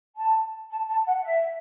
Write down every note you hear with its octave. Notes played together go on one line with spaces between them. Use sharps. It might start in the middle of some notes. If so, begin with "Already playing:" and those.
A5
A5
A5
F#5
E5